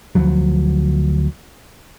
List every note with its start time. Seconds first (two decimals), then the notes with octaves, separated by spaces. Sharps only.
0.15 D2 F3 F#3